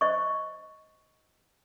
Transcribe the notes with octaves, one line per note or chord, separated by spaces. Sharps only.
C5 D#5 C#6